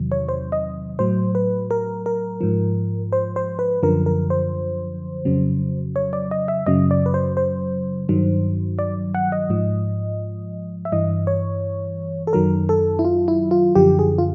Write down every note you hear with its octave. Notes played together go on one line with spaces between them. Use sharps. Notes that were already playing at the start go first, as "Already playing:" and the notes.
Already playing: E2 C3 D#3 F#3
C#5
C5
D#5
A2 F#3 C5
B4
A#4
A#4
G#2 F3
C5
C5
B4
F#2 D3 F3 A#4
A#4
C5
F2 C#3 F#3
C#5
D5
D#5
E5
F#2 C#3 F#3 D#5
D5
B4
C5
C5
G2 D#3 F#3
D5
F#5
D#5
G#2 F3
E5
G2 E3 D#5
C#5
A4
F#2 D#3 F#3 A#4
A4
E4
F4
E4
F4
F#2 D3 F3 G4
G#4
F4